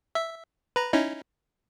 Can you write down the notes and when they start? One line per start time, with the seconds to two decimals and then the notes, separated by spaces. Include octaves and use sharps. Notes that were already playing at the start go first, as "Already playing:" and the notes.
0.15 E5
0.76 B4 A#5
0.93 C#4 D#4 E4